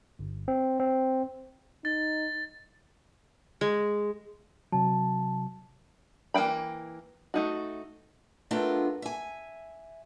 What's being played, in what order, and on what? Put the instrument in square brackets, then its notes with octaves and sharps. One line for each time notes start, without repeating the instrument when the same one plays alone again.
[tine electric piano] G1
C4
C4
[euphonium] D#4 [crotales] A6
[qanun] G#3
[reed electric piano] C3 F#3 [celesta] A5
[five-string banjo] E3 A#3 F5 G5 B5
A3 D#4 F#4
[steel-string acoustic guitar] A3 B3 D4 F4 A4 A#4
E5 G#5